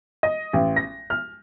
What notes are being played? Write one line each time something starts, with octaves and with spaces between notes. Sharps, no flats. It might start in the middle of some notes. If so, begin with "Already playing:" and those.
D#5
A1
A#6
F6